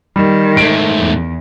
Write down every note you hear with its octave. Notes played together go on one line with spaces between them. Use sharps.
D#3 G3
G#2 A3 D7
E2